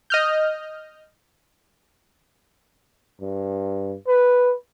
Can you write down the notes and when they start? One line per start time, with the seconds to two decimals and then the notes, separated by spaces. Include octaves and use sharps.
0.10 D#5 F6 G6
3.21 G2
4.07 B4